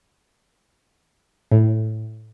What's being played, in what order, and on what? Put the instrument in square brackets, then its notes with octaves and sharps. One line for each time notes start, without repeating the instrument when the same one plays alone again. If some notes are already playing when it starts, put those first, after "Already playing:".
[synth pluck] A2